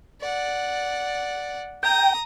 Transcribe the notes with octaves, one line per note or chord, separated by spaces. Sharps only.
D5 F#5
G5 A#5 D#6